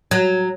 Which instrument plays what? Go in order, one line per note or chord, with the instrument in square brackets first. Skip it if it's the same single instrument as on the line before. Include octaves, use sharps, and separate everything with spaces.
[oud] F#3